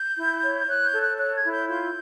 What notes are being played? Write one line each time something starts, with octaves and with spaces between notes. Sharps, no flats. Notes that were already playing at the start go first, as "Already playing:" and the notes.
Already playing: G6
E4
C#5
C#5 F#6
G6
A4
F#6
C#5 F#6
G#6
E4
G6
F4 G6